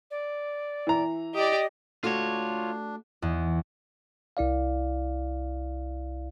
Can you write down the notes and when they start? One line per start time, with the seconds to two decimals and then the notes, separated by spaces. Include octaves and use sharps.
0.11 D5
0.87 E3 A#5
1.35 G4 D5 D#5 D#6
2.04 A3 D4 F4 F#4 C#5
3.22 E2
4.37 C2 E4 D5 F5